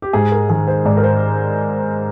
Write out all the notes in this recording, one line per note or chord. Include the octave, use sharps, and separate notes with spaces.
G4
G#2 G#4
A#4
D#3 G#4
C5
G#2 D5
A#4
C5